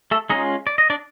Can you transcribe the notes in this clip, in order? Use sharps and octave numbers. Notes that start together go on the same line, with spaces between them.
A3 A4
G#3 C#4 D#4 F4 D#5
D5
D#5
D4 D5